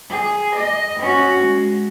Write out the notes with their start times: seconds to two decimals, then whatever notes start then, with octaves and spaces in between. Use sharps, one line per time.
0.11 G#4
0.55 D#5
1.00 C#4 F#4
1.43 G#3